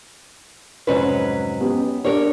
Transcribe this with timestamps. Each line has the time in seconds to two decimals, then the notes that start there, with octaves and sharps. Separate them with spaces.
0.87 F1 G#2 F#3 C#4 B4 C#5
1.61 B3 C#4 G4
2.05 D4 G4 A#4 C#5 D5